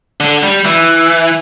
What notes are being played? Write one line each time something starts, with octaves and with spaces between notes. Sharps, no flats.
D3
G3
E3